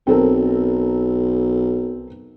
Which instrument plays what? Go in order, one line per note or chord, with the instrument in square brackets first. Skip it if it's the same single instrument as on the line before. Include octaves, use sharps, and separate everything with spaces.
[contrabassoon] B1 [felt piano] C4 A4 A#4